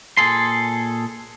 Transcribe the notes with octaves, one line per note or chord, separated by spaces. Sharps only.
A#2 G#4 A4 C6